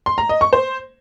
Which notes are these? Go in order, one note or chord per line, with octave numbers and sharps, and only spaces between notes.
C6
A#5
D#5
C#6
C5